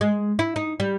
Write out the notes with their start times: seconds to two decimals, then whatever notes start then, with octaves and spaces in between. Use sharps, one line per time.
0.01 G#3
0.39 E4
0.56 D#4
0.80 G3